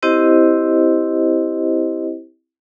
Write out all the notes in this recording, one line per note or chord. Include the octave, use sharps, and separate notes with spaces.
C4 E4 G4 C5 D#5